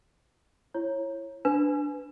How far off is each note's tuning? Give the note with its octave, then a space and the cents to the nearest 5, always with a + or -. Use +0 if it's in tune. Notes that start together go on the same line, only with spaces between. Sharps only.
E4 +20 C#5 -20
D4 +0 B4 +15